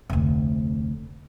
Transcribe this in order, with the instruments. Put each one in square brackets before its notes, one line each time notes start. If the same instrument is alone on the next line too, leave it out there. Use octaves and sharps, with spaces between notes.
[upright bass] F1 D2